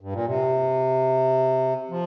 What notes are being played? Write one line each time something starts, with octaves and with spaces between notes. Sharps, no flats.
G2
A#2
C3
F3